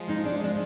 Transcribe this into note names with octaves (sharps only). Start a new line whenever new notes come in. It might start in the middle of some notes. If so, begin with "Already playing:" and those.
Already playing: F3 G#3
D#4
D4
D4